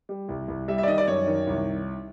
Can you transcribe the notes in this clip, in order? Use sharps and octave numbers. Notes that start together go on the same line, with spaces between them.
G3
C2
C2
G3 E5
E5
D5
D#3 D#5
D5
F#2 C#5
D#3
C2